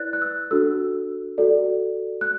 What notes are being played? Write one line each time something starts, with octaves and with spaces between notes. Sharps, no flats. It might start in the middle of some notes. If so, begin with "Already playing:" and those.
Already playing: E4 B4 D5 F#6 A6
F#6
E6
D4 F#4 A4 E6
F#4 A4 D5
F#6